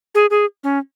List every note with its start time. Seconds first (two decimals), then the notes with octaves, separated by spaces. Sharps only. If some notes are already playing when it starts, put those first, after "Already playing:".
0.15 G#4
0.30 G#4
0.64 C#4